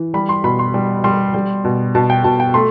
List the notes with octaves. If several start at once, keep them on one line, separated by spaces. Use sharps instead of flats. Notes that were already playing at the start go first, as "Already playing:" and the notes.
Already playing: E3
G3 B5
C6
B2 B5
C6
G3
G3 C6
G3
B2
B2 A5
G5
B2 A5
G5
A3 C6